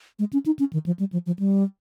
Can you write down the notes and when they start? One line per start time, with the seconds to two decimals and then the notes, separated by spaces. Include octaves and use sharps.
0.19 G#3
0.33 C#4
0.46 D#4
0.59 C#4
0.73 D#3
0.86 F3
0.99 G3
1.12 F3
1.26 F3
1.39 G3